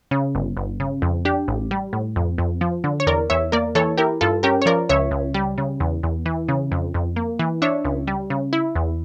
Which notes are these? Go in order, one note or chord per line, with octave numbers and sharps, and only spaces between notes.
C#3
G1
G1
C#3
F2
D4 G4
A1
G3
A2
F2
F2
F3
D3
C#5
E2 A#4 D5
E2 C#5 E5
A#3 A#4 D5
E3 A4 C#5
E4 G4 A#4
G2 F4 A4
C#4 G4 A#4
C#5
F3 A#4 D5
C#2 C#5 E5
C#2
G3
C#3
E2
E2
E3
C#3
F2
F2
A#3
E3
D4 C#5 E5
C#2
G3
C#3
E4
E2